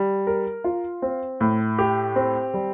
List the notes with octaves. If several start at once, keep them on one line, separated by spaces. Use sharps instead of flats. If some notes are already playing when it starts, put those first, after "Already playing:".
Already playing: G3
A#4
F4
C4
A2
G4
C4
G3